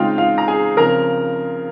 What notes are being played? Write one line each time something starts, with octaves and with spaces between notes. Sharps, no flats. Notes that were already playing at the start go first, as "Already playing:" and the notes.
Already playing: C#3 G#3 C4 D#4 F4 F5 G5
F4 F5
A#5
G#4 G#5
C#3 F3 C4 A#4 A#5